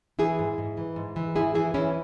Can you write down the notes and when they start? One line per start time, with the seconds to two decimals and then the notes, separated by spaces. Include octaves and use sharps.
0.19 E3 E4 G#4
0.39 G#2
0.58 G#2
0.77 E3
0.96 G#2
1.16 E3
1.35 G#2 E4 G#4
1.54 E3 E4 G#4
1.74 E3 C#4 E4